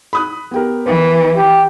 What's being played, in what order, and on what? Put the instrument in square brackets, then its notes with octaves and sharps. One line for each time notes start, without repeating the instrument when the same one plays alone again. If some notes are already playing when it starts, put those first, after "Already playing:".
[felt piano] B5 D#6 F#6
B3 G4 A#4
[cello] E3 [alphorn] B4
[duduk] G4